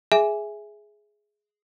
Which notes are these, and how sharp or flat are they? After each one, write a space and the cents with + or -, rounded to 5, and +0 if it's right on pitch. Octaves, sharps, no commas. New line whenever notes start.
G#4 +5 E5 +0 G#5 +0